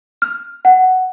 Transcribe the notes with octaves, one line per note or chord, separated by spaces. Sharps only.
F6
F#5